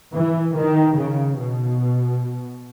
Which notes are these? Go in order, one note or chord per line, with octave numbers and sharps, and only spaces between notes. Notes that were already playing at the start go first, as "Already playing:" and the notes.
E3
D#3
C#3
B2